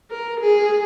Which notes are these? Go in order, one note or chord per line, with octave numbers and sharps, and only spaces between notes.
A#4
G#4